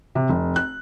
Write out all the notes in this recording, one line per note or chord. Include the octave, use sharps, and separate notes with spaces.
C3
F1
F#6